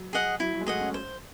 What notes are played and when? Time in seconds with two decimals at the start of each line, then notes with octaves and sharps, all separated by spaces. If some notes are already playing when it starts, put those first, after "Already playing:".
Already playing: F#3
0.13 G#4 D#5 F#5
0.40 F#3 E4
0.54 F#3
0.61 G#3
0.67 A3 G#4 D#5 F#5
0.81 C#4
0.94 C5